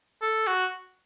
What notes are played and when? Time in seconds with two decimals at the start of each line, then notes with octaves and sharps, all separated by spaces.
0.22 A4
0.47 F#4